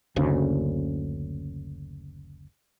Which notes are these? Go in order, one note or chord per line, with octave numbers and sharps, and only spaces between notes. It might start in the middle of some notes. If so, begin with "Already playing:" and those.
F#1 D2 C#3